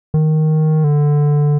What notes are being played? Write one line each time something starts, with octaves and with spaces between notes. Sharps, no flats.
D#3
D3